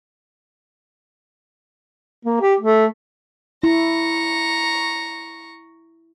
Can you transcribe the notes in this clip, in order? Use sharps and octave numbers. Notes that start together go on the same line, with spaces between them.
A#3
G4
A3
E4 A#5 C#6